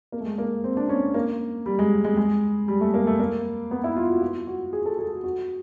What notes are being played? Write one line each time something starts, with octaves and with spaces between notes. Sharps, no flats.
A#3
A3
G#3
A#3
C4
D4
C#4
A#3
G3
G#3
G#3
G#3
G3
A3
A#3
A3
A#3
B3
E4
F4
F#4
F4
F#4
G#4
A4
A4
F#4
F#4